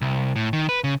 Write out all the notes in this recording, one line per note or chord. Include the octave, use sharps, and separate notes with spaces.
C2
A2
D#3
B4
C#3